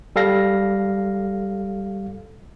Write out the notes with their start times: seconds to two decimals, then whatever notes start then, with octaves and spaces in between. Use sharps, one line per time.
0.16 G3 A4 F5 A#6